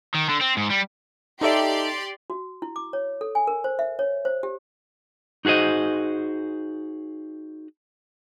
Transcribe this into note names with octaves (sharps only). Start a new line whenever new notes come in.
D#3
D3
C4
G#2
G3
D#4 G4 A4 D5 E5 C6
F#4
E4
D6
C#5
A4
G#5
A#4
C5
E5
C#5
C5
G4
D#4 F#4 G#4 C5 D#5